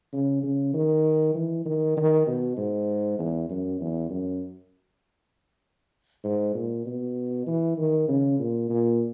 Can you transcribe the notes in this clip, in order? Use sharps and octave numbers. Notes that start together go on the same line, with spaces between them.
C#3
C#3
D#3
E3
D#3
D#3
B2
G#2
E2
F#2
E2
F#2
G#2
A#2
B2
E3
D#3
C#3
A#2
A#2